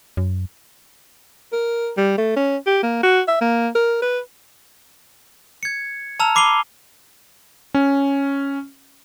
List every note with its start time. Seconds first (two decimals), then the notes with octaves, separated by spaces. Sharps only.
0.17 F#2
1.53 A#4
1.97 G3
2.18 A3
2.37 C#4
2.67 G4
2.83 A#3
3.03 F#4
3.28 E5
3.41 A#3
3.76 A#4
4.02 B4
5.63 G#6 C#7
6.20 A5 A#5 E6 F6 F7
6.35 B5 D6 C7 D#7 G7
7.74 C#4